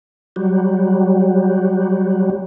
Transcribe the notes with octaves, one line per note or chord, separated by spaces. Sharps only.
F#3 G3